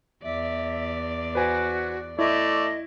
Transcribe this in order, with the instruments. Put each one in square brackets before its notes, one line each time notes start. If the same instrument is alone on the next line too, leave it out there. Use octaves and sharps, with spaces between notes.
[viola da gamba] E2 D5 [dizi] E5
[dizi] F#4 [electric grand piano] B4 C5 G#5
[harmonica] A3 D5 [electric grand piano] E4 [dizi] D#5